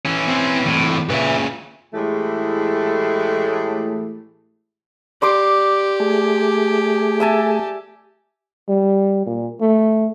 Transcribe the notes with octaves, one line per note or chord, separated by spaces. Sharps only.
E3 C#4
C4
A2 E3 C4
A#2 C#3 B4 E5
A2 E3 G#3 A3 G4 G#4
G4 D5 C6 D6
A3 G#4
E5 G#5 A5
G3
A#2
A3